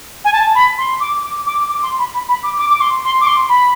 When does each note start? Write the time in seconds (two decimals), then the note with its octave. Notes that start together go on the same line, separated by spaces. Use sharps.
0.25 G#5
0.33 A5
0.55 B5
0.78 C6
1.00 D6
1.23 D6
1.46 D6
1.69 D6
1.83 C6
1.99 B5
2.14 B5
2.28 B5
2.43 D6
2.59 D6
2.70 D6
2.81 C6
3.04 C6
3.21 D6
3.27 C6
3.49 B5